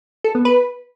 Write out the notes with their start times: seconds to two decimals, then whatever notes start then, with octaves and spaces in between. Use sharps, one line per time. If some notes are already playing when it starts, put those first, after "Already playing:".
0.24 A4
0.35 B3
0.45 B4